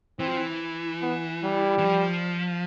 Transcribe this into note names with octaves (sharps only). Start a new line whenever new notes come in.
E3 C4
F3
E3
B3
G3
E3
F3